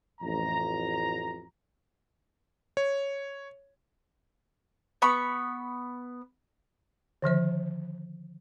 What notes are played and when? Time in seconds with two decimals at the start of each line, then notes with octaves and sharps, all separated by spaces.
0.21 A1 F2 A#5
2.77 C#5
5.02 B3 B5 C#6
7.22 D3 D#3 F3 C5